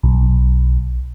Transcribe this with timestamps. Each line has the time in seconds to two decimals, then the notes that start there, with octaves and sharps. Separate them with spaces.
0.03 B1